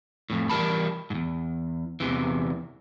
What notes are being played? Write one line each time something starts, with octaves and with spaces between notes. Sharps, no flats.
F2 A2
E3 G3 A#4 A5 B5
E2 G#2
E2 G2 C3 E3